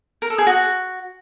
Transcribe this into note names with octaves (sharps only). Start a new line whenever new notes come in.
A#4
A4
G#4
F#4